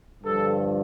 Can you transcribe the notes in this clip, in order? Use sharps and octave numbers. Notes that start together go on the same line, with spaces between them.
G2 D3 F3 A4